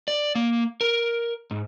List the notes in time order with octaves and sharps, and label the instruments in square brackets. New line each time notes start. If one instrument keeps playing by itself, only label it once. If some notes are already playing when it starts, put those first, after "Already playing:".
[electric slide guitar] D5
A#3
A#4
G#2